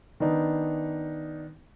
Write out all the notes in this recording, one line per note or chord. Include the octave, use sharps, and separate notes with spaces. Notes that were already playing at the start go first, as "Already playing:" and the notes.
D#3 B3 D4 D#4